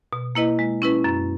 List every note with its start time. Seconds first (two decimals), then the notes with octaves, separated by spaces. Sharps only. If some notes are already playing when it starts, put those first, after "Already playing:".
0.13 B2
0.35 A#3 E4 B4 D#5
0.59 G#3
0.82 C#4 E4 B4
1.04 F#2